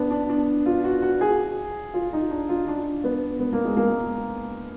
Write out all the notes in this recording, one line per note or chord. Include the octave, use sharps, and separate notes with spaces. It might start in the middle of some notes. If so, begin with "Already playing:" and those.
Already playing: B3 D4
D4
D4
F4
F#4
F#4
G#4
F4
D#4
D4
F4
D4
B3
B3
A#3
G#3
A#3